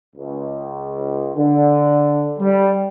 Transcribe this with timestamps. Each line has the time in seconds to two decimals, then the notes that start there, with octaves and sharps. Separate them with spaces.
0.16 C#2
1.35 D3
2.39 G3